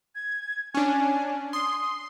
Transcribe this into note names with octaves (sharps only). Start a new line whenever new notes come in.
G#6
C#4 D4 G#5
C6 D#6